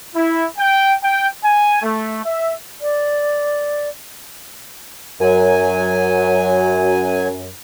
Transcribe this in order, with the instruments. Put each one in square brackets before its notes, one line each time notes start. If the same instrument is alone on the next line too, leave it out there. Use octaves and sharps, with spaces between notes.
[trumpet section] E4
G5
G5
G#5
A3
E5
[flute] D5
[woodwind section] F#2 [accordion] F#3 G#5